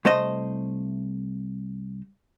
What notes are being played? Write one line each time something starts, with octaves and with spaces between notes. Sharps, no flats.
C2 A3 C5 D#5